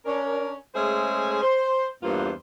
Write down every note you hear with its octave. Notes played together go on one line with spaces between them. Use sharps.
C#4 D4 A#4
G#3 A3 C#4 G#4 C5 E5
C5
E2 G2 A#3 B3 F4 C5